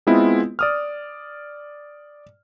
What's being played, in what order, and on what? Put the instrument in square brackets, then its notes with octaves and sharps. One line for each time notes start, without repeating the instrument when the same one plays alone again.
[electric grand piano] G#3 B3 C4 E4 F4 D#5
D5 D#6 F6